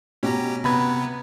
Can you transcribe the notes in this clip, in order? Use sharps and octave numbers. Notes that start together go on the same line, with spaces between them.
B2 C#4 G4 A#5
C3 B3 A#5 B5 G#6